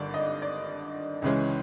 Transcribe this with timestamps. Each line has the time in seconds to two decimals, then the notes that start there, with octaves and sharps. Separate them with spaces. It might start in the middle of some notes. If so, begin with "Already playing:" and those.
Already playing: G#1 G2 D3 D5
0.14 D#5
0.42 D5
1.22 C#2 C#3 E3 G#3 C#4